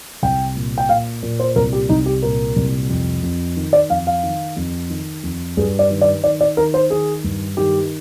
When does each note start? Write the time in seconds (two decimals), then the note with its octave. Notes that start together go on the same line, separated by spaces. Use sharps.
0.23 C2 G5
0.56 A#2
0.78 G5
0.89 A#2 F5
1.23 A#2
1.40 C5
1.56 C2 A#4
1.73 G4
1.89 C2 D#4
2.06 G4
2.22 A#2 A#4
2.56 C2
2.90 F2
3.23 F2
3.56 D#3
3.73 D5
3.90 F2 F5
4.07 F5
4.23 D#3
4.56 F2
4.90 D#3
5.23 F2
5.57 G2 G#4
5.79 D5
5.90 D#3
6.01 D5
6.23 D#3 D5
6.41 D5
6.57 D#3 A#4
6.74 C5
6.90 D#3 G#4
7.24 G2
7.57 D#3 G4